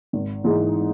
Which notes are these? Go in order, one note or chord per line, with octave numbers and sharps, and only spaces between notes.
G#1
G#2 E3 G#3 D#4